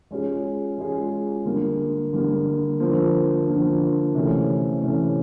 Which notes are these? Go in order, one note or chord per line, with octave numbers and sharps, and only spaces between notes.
G#3 C#4 F4 G#4
G#3 C#4 F4 G#4
D3 G3 A#3
D3 G3 A#3
D3 F3 A#3
D3 F3 A#3
C3 E3 A3 C#4
C3 E3 A3 C#4